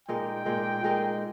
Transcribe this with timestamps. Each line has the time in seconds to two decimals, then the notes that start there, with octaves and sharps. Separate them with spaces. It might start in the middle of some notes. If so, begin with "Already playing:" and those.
0.09 A#2 G#3 D#4 A#4 G5
0.45 A#2 G#3 D#4 A#4
0.83 A#2 G#3 D#4 A#4